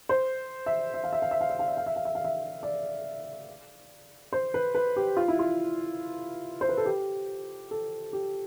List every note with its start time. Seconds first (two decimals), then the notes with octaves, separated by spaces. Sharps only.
0.09 C5
0.66 E5
0.94 E5
1.04 F5
1.13 E5
1.22 F5
1.31 E5
1.41 F5
1.50 E5
1.59 F5
1.68 E5
1.77 F5
1.86 E5
1.96 F5
2.05 E5
2.15 F5
2.24 E5
2.63 D5
4.33 C5
4.54 B4
4.75 B4
4.96 G4
5.17 F4
5.28 E4
5.39 F4
6.61 C5
6.69 B4
6.77 A4
6.86 G4
7.71 A4
8.13 G4